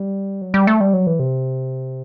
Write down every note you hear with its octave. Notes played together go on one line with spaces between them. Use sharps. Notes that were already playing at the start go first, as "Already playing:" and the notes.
Already playing: G3
F#3
G3
A3
G3
F#3
E3
C3